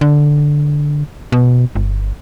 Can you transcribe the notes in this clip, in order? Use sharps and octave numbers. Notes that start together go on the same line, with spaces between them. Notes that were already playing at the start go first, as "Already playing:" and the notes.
D3
B2
G1